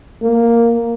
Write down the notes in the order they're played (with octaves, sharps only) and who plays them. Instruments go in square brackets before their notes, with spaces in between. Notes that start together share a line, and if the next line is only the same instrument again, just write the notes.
[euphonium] A#3